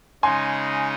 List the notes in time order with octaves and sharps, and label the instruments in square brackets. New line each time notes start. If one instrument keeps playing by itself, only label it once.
[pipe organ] C#3 G#3 D#4 [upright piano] G#5 C6